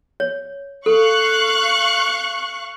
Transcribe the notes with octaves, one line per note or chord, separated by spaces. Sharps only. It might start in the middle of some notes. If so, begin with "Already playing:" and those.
C#5
A4 F5 C#6 F#6